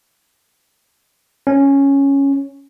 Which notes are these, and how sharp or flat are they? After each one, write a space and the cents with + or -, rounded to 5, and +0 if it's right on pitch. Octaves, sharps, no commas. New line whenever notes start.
C#4 +0